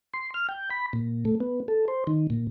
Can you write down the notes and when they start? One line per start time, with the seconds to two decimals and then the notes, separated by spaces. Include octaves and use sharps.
0.14 C6
0.34 F6
0.49 G5
0.70 B5
0.93 A#2
1.25 A3
1.40 B3
1.68 A4
1.88 C5
2.07 D#3
2.30 A#2